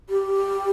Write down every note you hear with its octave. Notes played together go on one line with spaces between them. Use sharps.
G4